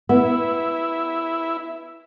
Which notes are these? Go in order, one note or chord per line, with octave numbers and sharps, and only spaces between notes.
B3 E4